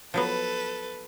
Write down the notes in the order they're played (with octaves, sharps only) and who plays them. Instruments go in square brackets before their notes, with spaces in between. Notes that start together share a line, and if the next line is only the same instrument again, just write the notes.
[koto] F3 F#3 B3 [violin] A4 B4